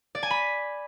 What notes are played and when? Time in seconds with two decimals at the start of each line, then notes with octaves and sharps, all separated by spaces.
0.15 D5
0.23 G#5
0.31 B5